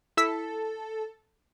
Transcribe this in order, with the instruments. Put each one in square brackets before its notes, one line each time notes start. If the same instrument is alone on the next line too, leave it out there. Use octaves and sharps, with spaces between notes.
[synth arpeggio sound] E4 E6 B6 [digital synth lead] A4